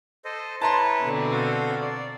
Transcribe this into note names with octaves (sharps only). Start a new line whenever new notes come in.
A4 C5 D#5
E4 B4 C#5 A5 A#5 C6
B2 D3 C4
F#4 A4 F5
D5